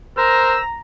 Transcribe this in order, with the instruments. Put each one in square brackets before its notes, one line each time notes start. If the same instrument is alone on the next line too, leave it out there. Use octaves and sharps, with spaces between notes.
[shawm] A#4 [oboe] C5 [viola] A#5 [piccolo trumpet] E6